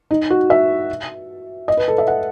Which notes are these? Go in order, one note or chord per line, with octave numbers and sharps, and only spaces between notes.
D#4
F#4
E5
D#5
B4
A4
E5
F#5